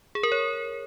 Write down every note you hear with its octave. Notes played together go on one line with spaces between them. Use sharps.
G#4
A#4
C#5